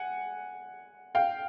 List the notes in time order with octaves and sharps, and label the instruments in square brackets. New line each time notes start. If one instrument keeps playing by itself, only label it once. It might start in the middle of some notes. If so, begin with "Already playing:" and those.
Already playing: [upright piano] F#5 G#5
F5 G5